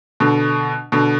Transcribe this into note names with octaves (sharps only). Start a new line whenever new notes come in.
B2 D3
B2 D3